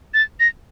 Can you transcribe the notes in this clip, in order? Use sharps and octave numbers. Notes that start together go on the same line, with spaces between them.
A6
A#6